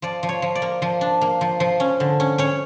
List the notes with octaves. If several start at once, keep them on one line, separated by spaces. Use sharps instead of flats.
F3 D5
F3
C#5
F3
D5
A#3
F3
D4
A#3
F3
F3
C#4
D3
C#4
C#4 C#5